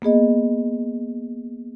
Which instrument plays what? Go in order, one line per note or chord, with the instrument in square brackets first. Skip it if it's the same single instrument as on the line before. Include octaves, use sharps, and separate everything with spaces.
[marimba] A#3 B3 G#4 D#5